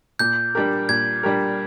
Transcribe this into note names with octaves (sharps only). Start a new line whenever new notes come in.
A#2 G6
G3 D4 G4 A#4
A#2 G#6
G3 D4 G4 A#4